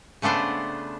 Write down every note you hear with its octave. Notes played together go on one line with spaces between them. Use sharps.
C#3 A3 B3 D4 C5